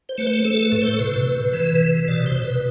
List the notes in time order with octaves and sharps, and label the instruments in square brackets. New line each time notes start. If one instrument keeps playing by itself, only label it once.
[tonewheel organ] C5
A3 B4
C5
A3 A4
B4
A2
C5
A4
C3 B4
C3
E3
C3
B2 D5
C5
B2
B4